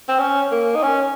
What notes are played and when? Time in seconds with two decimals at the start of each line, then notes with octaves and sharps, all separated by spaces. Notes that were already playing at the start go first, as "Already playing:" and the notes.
0.09 C4
0.19 C#4
0.52 A#3
0.75 D#4
0.83 C#4